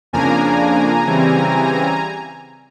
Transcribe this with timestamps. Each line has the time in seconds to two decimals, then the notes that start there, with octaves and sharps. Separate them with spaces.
0.13 F2 C#3 F3 A#3 D4 G#5 A#5
1.07 C#3 E3 G3 C4